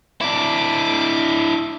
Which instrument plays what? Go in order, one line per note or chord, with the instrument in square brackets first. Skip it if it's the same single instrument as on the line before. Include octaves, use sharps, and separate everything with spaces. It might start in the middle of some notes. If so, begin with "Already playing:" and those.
[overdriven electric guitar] D4 E4 [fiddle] D6